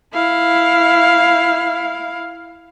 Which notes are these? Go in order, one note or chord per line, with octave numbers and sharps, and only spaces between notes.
E4 F5